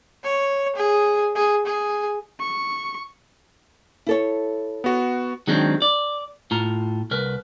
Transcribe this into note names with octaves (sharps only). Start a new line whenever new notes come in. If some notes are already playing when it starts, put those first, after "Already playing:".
C#5
G#4
G#4
G#4
C#6
E4 A4 C#5
B3 F#4
D#3 F#3 G#3 C4 D4
D5
A2 F4 A#5
C2 A#4 B4